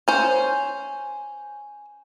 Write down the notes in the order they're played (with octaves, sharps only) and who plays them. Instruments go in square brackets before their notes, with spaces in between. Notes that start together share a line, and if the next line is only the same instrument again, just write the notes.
[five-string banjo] C#4 C5